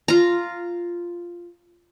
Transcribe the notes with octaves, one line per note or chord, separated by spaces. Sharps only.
F4 A#5